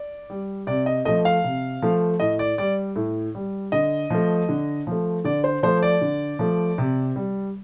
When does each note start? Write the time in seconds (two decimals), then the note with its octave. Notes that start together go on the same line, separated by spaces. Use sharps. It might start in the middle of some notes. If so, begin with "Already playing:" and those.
Already playing: D5
0.30 G3
0.67 C3 D5
0.86 D#5
1.05 F3 A3 D#5
1.25 F5
1.44 C3
1.82 F3 A3
2.20 A2 D#5
2.39 D5
2.58 G3 D5
2.96 A2
3.35 G3
3.72 D3 D#5
4.10 F3 A3
4.49 D3
4.87 F3 A3
5.24 D3 D5
5.44 C5
5.63 F3 A3 C5
5.82 D5
6.01 D3
6.39 F3 A3
6.78 C3
7.16 G3